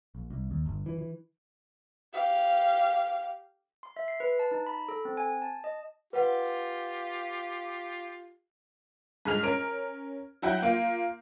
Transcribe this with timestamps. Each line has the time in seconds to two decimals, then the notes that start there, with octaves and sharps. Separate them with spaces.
0.15 A#1
0.30 C2
0.51 D#2
0.66 G1
0.86 E3
0.99 E3
2.14 G4 F5
3.83 C6
3.97 E5
4.08 C7
4.20 B4
4.39 A5
4.51 D#4
4.66 B5
4.89 A4
5.05 C4
5.17 G#5
5.42 A5
5.64 D#5
6.13 F4 G4 B4 F#5
9.25 G#2 G#4 F6 F7
9.43 C#4 A#4 D7
10.42 F#3 E4 F#5 G5 G6
10.62 A#3 F4